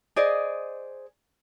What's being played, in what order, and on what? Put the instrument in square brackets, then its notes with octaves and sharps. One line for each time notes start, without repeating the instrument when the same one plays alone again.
[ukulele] G#4 C5 D5 D#5